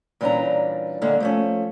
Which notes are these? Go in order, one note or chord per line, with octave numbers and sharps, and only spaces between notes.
A#2 E3 G3 C#4 D4 A#5
D3 G3 G#3 A#3
F3 A3 C#4